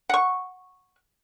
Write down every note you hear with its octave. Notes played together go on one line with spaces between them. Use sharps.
F#5 C#6